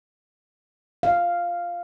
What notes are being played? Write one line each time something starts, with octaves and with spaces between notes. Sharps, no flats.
F5